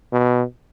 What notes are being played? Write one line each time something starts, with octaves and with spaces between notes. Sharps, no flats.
B2